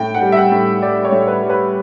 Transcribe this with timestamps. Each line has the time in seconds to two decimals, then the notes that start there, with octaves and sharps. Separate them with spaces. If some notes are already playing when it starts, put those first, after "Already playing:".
Already playing: A2 G5
0.15 F#5
0.22 G3
0.32 E5
0.37 F#5
0.52 A2
0.82 G3 D5
1.05 C#5
1.12 A2
1.28 B4
1.42 G3
1.50 B4